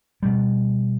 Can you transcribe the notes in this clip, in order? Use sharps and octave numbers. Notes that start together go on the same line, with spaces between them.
B2 G3